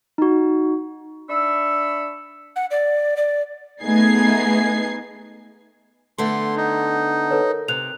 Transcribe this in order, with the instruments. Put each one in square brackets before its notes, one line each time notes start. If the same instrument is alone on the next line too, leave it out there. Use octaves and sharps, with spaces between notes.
[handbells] D#4 F#4
[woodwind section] D4 E5 B5 C#6 E6
[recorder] F#5
D5
D5
[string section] A3 B3 D#4 G#4 G#6 C7
[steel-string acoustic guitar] D3 A3 B3 [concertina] C6
[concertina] D#4
[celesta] A4 B4 C#5
A#4
[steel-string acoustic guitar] C3 [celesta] F#6 F7